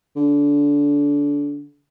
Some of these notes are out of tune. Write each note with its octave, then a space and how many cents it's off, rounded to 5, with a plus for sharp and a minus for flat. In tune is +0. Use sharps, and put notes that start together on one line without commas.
D3 -25